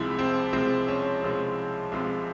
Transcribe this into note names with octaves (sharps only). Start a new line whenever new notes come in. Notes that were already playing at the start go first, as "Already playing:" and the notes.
Already playing: C2 C3 F3 G#3 E4
C4
C2 C3 F3 G#3 C4
C#4
C2 C3 F3 G#3
C2 C3 F3 G#3